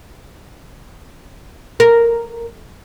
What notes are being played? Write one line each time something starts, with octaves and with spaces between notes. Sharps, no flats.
A#4